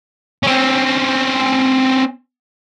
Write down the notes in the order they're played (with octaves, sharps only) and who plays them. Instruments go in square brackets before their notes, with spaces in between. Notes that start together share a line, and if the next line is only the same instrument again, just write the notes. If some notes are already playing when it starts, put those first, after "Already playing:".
[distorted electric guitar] C4 C#4